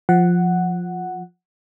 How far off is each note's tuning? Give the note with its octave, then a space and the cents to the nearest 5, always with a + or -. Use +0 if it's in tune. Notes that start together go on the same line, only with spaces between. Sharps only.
F3 +10 F#5 +0